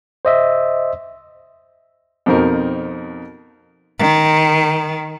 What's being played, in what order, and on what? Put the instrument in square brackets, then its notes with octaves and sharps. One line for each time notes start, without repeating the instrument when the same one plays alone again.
[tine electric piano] C5 D#5 E5
[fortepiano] F2 B2 C4 D#4 A#4
[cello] D#3